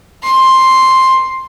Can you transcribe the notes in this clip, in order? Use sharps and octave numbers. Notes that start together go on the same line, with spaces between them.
C6